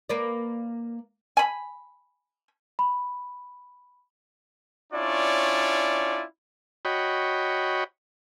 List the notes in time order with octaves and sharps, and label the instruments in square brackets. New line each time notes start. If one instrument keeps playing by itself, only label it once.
[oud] A#3 B4 D5
[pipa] G#5 B5
[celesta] B5
[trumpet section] C#4 D4 E4 F4 C#5 D5
[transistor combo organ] F#4 C#5 D#5 G5 B5